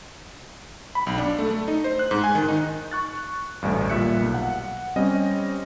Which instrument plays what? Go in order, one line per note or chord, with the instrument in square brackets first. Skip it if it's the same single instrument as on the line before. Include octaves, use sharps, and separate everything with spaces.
[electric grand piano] B5
B1
D4
A3
A3
D#4
C5
F#6
G#2
G#5
D#3
D#4
C#6 F#6 A6
A1 D2 G2
A#2 G3 E5 F#6 C#7
B1
F#5
G3 C4 C#4 D#5